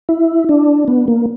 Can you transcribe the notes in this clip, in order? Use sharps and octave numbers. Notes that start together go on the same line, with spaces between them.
E4
D4
B3
A#3